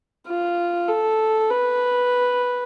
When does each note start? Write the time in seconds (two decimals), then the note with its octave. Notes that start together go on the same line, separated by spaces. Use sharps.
0.27 F4
0.88 A4
1.50 B4